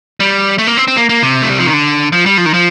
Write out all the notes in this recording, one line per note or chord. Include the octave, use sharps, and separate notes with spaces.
G3
A3
A#3
C4
C4
A#3
A#3
C3
A3
G3
F3
D#3
D3
F3
G3
F3
D#3
F3